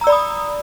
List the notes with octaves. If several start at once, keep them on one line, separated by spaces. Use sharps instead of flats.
D5 A#5 B5 D#6 E6